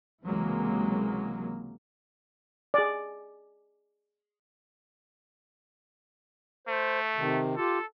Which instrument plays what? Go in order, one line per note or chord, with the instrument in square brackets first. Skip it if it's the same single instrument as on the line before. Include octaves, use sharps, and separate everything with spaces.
[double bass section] C#2 C3 E3 F#3 G#3 A#3
[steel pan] G#4 D5
[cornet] A3 [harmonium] C5
[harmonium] C3 D#3
[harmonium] F4 G4 [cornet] A4